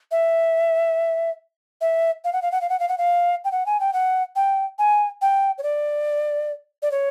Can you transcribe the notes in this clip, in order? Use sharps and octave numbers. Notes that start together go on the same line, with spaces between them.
E5
E5
F5
F#5
F5
F#5
F5
F#5
F5
F#5
F5
G5
F#5
G#5
G5
F#5
G5
G#5
G5
C#5
D5
D5
C#5